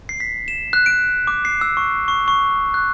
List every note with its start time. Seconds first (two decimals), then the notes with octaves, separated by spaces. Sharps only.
0.09 C7
0.20 B6
0.48 E7
0.73 F#6
0.86 D7
1.27 D6
1.45 C7
1.61 E6
1.77 C#6
2.08 C#6
2.28 C#6
2.74 F#6